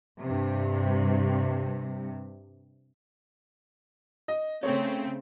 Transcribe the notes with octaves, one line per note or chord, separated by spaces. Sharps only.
G2 C3
D#5
C#3 A3 C4 C#5